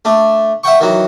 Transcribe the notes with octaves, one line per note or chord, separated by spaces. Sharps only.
A3 D4
E5 F#5 G5 C#6
D#3 E3 F#3